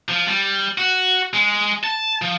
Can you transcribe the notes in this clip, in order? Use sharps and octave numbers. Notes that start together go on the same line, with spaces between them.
F3
G3
F#4
G#3
A5
F3